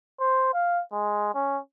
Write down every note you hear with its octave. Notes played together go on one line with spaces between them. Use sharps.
C5
F5
G#3
C#4